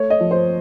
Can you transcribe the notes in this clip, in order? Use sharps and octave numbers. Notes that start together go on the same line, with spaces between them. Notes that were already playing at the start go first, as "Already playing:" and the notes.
Already playing: A3 C#5
D#5
F3
C5